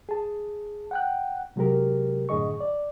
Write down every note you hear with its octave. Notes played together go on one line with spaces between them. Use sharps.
G#4 A5
F#5 G5 F#6
C3 F#3 G#3 G4 A#4
F#2 A2 D3 G#4 D#5 C#6
D5